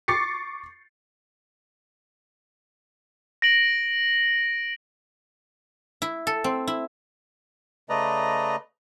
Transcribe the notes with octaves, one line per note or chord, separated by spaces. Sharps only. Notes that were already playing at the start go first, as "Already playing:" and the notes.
C#6 D6 A6 C7 C#7
A#6 D7 F#7
E4
A4
C4
E4
C#3 A3 B4 D5 D#5 A#5